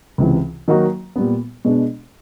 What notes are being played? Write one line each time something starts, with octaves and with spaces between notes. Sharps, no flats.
C#2 C3 E3
D#3 F#3 A#3 D#4 F#4
A#2 G3 B3
B2 G#3 B3 D4